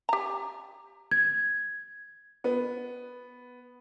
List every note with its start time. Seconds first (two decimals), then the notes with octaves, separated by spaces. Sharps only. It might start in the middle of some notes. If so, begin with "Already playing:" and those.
0.09 G4 A#5
1.11 G#6
2.44 B3